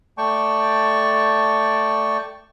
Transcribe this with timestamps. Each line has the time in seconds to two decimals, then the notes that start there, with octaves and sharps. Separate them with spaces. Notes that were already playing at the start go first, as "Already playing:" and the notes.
0.18 A3 D5 G5 A5 C#6